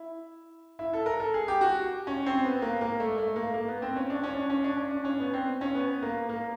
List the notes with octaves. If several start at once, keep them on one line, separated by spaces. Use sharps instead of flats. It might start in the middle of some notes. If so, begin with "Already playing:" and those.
Already playing: E4
E4
A4
A#4
A4
G#4
G4
F#4
C#4
C4
B3
A#3
A#3
A3
A3
A#3
A#3
B3
C4
C#4
D4
C#4
D4
C#4
D4
C#4
D4
C#4
B3
C4
C#4
B3
A#3
A#3